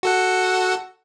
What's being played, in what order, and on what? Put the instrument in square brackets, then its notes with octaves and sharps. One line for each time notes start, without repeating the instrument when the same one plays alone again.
[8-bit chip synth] F#4 A4 F#5